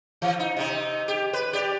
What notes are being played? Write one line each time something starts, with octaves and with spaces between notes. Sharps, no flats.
E3
D#4
C3 D#4
G4
B4
G4 D5